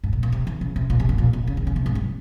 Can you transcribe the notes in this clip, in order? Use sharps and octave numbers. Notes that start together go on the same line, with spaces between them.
G#2
A#2
A#2
C3
D#3
C#3
C3
A#2
C3
G2
A#2
C3
C#3
D#3
C#3
C3
G#2
G2